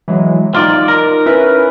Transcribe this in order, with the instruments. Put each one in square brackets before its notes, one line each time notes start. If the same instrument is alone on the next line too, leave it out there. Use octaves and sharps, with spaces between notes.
[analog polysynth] E3 F#3 G#3
[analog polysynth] D#4 [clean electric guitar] F4 D5
[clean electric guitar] A#4
[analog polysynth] C#4 E4 B4